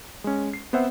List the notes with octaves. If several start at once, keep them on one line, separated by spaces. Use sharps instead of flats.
G#3 C#4
C7
B3 C4 C5 E5 F#5